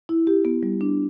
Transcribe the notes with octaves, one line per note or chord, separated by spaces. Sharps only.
E4
G4
B3
G3
D4